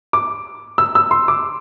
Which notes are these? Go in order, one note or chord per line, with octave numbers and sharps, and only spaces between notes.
D6
E6
E6
C6
D6